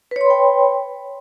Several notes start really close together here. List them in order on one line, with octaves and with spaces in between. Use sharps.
B4 C#5 C6 B5 G5